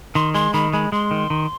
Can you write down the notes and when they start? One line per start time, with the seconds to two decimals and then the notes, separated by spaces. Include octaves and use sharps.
0.15 D#3 C6
0.34 G#3 C6
0.53 D#3 B5
0.73 G#3 B5
0.92 G#3 C6
1.11 D#3
1.30 D#3